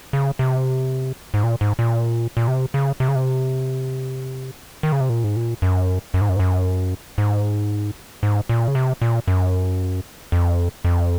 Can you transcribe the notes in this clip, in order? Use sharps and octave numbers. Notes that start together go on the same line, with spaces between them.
C#3
C3
G#2
A#2
G#2
A#2
A#2
C3
C#3
C3
C#3
C3
D#3
C#3
C3
A#2
G#2
A#2
F#2
F#2
G#2
F#2
G#2
F#2
G#2
G#2
A#2
C#3
C3
A#2
F#2
F2
F2